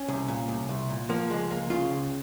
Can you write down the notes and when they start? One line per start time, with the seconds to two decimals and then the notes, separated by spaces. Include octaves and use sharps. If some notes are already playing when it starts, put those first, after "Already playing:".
Already playing: C#4
0.08 C2
0.28 A#2
0.49 C2
0.69 C2
0.90 A#2
1.09 F3 A#3
1.30 C#2 G#3
1.50 C#2 A#3
1.70 C#3 F4
1.90 C#2